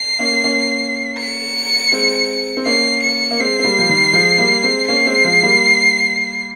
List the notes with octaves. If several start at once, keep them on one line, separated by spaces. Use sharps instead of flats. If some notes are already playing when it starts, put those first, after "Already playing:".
Already playing: C7
A#3 C#4
A#3 C#4
C#7
G#3 C4
C4
A#3 C#4 C7
C#7
A#3
G#3 C4 C7
C4
G3 A#3
F3
D#3 G3
F3 G#3
G3 A#3
G#3 C4
A#3 C#4 C7
G#3 C4
F3 G#3
G3 A#3